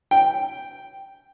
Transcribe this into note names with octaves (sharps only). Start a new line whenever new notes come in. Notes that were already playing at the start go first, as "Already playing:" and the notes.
G5